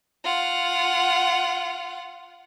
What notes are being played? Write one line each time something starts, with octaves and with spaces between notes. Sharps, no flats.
F4 F#5